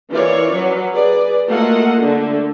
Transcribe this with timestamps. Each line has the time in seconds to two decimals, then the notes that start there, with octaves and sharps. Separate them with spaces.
0.10 E3 F4 A#4 C#5 D5
0.53 F#3 C#4 B4
0.93 G#4 B4 D5
1.47 A3 A#3 F4 F#4 D#5 F#5
2.00 D3 A3